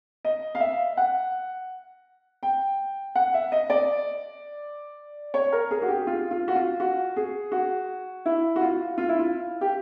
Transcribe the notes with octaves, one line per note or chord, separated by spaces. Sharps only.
D#5
F5
E5
F#5
G5
F#5
E5
D#5
D5
C#5
A#4
G#4
F#4
G4
F4
F4
F#4
F4
F#4
G#4
F#4
E4
F#4
F4
F4
E4
F4
G4